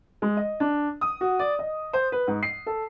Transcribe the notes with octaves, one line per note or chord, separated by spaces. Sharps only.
G#3
D#5
D4
D#6
F#4
D5
D#5
C5
B4
G#2
C7
A4